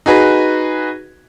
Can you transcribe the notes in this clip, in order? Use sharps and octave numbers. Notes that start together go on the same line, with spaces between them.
D#4 F#4 G#4 B4